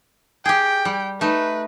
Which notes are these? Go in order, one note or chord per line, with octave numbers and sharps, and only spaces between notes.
G4 G#4 G5
G3
A3 D#4 B4